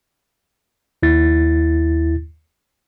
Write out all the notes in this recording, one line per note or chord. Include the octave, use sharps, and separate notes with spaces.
D#2 E4 A6